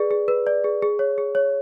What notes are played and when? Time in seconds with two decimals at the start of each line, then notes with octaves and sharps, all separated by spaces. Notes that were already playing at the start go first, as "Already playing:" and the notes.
Already playing: G#4 B4 D5
0.11 G#4
0.28 B4
0.47 D5
0.64 G#4
0.82 G#4
0.99 C#5
1.18 G#4
1.35 C#5